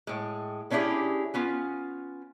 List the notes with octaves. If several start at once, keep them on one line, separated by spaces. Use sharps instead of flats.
A2 G#3
D#3 C#4 D4 E4 G4 G#4
B3 C#4 F4